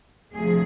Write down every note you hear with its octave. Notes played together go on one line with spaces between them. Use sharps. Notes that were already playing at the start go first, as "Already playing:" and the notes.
D2 C3 F3 G#4